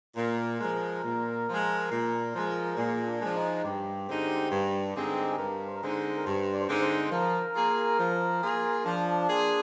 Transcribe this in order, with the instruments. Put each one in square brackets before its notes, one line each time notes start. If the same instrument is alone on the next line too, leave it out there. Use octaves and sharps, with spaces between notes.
[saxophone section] A#2 [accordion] A#4
[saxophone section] F3 G#3
A#2
F3 G#3
A#2
F3 G#3
[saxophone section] A#2 [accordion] G#4
[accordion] D4
[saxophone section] F3 G#3
[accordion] D#4
[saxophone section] G2 [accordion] G4
[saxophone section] D3 G#3 C4 D#4
G2
D3 G#3 C4 D#4
[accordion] G#4
[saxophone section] G2 [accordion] A#4
[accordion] C5
A#4
[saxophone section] D3 G#3 C4 D#4 [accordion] C5
[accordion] A#4
[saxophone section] G2 [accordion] C5
[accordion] D5
C5
[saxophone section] D3 G#3 C4 D#4 [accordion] D5
[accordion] C5
[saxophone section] F3 [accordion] A#4
[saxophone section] A#3 F4 G#4
F3
A#3 F4 G#4
[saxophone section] F3 [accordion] D4
[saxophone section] A#3 F4 G#4